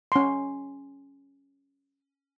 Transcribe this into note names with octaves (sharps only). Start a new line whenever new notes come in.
C#4 C6